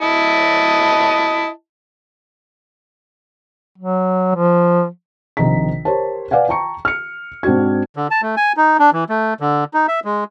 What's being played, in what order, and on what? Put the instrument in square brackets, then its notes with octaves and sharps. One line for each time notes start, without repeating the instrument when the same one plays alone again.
[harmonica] E4 D#5 A5
[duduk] F#3
F3
[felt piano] A#1 C3 D#3 D#5 A#5 B6
G4 A#4 C5 C#5 A5
B4 D5 F5 F#5 G#5
G5 A5 A#5 C#6 C#7
F6 C#7
G#2 C4 D4 F#4 G#6
[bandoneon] D3
A5
A3
G#5
D#4
D4
E3
A3
D3
D#4
E5
G#3